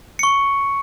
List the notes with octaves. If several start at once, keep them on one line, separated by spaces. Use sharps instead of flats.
C#6 C#7